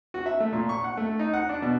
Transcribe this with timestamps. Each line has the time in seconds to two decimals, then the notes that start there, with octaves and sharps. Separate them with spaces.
0.14 F#4
0.26 E5
0.40 A3
0.53 A#2
0.69 C#6
0.84 F#5
0.97 A3
1.19 D#4
1.34 F#5
1.49 D4
1.62 B2